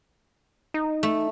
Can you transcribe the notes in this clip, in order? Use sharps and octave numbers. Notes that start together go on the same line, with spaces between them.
D#4
A3